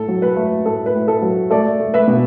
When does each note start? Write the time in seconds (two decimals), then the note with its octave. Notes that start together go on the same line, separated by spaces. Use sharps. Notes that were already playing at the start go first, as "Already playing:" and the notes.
Already playing: A2 A4
0.08 F#3
0.22 B4
0.36 A3
0.65 A2 A4
0.86 B4
0.94 A2
1.08 A4
1.22 F#3
1.50 A3 A4 D5
1.80 A3
1.94 B4 E5
2.08 B2